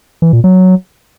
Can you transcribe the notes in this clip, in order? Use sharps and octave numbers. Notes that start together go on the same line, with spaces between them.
E3
A#2
F#3